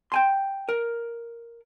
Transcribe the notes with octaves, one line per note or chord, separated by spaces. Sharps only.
G5 G#5 C6
A#4